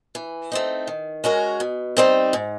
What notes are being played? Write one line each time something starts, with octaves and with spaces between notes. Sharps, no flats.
E3
A3 C4 D#4
D#3
G#3 C#4 F#4 A#4
B2
G3 C4 D#4
G#2